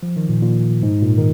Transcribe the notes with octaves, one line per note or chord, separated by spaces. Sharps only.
F3
D#3
A#2
A#2
G#2
A#2
D#3